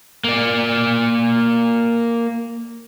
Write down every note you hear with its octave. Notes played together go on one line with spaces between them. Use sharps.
A#3 D5